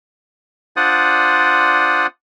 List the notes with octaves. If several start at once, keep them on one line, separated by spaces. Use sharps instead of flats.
D4 F4 C5 D5 F#5 D#6